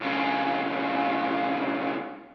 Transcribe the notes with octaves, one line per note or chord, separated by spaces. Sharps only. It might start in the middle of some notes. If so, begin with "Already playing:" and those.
B1 C#3